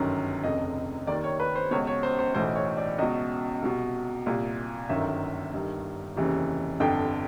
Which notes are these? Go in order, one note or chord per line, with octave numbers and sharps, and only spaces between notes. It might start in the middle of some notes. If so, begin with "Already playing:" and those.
Already playing: G1 F#2 D#3
F1 F2 C#3 D#5
D#2 D#3 D5
C#5
B4
C5
C#2 B2 C#5
C#5
C5
C5
B1 A2 E3 C5
C#5
D5
C#2 B2 D#5
C2 B2
C2 A#2
G1 F#2 D#3 E5
G1 G2 D#3
F1 D#2 C#3 E3
G1 F2 D3 G5